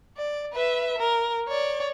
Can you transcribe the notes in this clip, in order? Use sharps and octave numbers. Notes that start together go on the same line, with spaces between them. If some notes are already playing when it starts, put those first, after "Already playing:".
D5
B4 E5
A#4
C#5 D5